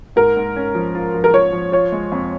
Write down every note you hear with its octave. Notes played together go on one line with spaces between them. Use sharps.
G#2 A#4
G#2
C#4
F3
F4
F3
A#4
F3 C#5
F3
F4 C#5
G#3
F2